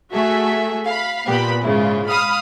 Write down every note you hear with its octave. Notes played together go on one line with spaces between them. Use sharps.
A3 F#4 G#4 A4 E5
F5 B5
A#2 B3 G4 B5
G#2 C#3 E4 F4
F5 B5 D#6 F6